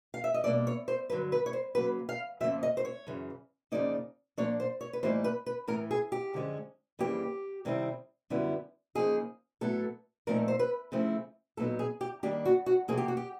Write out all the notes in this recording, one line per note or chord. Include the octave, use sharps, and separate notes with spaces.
F5
E5
D#5
B2 G3 A#3 D4 D5
C#5
C5
G2 D3 F#3 B4
B4
C#5
C5
C#3 F#3 A#3 B4
F5
F2 C#3 F3 A#3 E5
D#5
C5
C#5
F#2 C#3 E3
F2 C#3 F3 A#3 D#4 D5
A#2 F3 A#3 D4 C#5
C5
C#5
B4
A2 E3 G3 A#3 D#4 C5
B4
B4
A2 E3 A3 A#4
G#4
G4
F#2 D3 F3 G#3 C#4
F2 C#3 E3 G3 A#3 G4
C3 D#3 G3 C4 E4
F#2 D3 G3 B3 E4
C#3 F3 A#3 D#4 G#4
A2 F#3 B3 E4 A4
A#2 F3 A3 C4 D#4 A#4
C5
B4
C#3 F3 A3 C4 E4
A#2 F#3 B3 D#4 A4
G#4
G4
D#3 G3 A#3 D4 G4
F#4
F#4
C3 F3 A#3 G#4
G4
F#4
G4